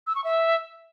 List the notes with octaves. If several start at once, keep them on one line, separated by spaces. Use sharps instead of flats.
E6
C#6
E5